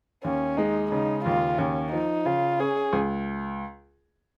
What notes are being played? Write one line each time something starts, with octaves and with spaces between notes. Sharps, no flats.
D#2 C#4
G#3 D#4
C#3 D#4
D#2 F4
D#2 C#4
F3 D#4
C#3 F4
C#4 G#4
C#2